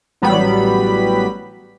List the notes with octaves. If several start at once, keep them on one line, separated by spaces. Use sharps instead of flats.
A1 F#3 G3 B3 B5